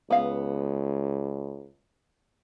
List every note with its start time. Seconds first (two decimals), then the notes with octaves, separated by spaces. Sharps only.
0.10 C#2 B3 F5